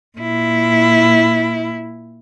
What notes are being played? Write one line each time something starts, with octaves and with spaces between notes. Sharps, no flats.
A#2 E4